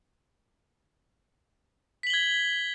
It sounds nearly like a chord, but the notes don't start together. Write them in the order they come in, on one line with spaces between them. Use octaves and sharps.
B6 F#7 G7 G#6